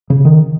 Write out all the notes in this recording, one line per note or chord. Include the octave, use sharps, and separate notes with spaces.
C#3
D#3